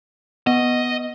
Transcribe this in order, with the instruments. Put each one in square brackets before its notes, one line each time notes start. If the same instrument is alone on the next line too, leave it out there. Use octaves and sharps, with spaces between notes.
[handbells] B3 [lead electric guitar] D#5